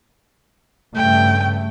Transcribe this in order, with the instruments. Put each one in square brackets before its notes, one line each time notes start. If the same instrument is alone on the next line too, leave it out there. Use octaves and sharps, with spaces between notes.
[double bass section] G2 C#3 A3 [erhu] G5